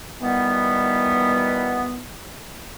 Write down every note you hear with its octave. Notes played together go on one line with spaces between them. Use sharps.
B2 D#3 E3 G3 B3